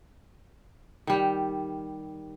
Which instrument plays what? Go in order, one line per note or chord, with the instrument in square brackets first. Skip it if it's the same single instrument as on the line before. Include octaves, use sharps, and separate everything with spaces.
[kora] D#3 G3